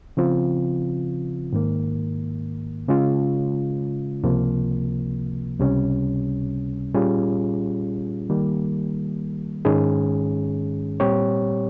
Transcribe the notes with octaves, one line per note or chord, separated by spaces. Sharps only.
C#3 F3 C4 F4
G#2 D#3 A#3
C#3 G#3 C#4 F4
C#2 C3 F3 A#3
C#2 C3 G3 C#4
A#2 G3 C#4 F4 G#4
D#3 G3 A#3
G#2 D#3 G#3 C#4 G#4
A#2 G3 C4 G4 C#5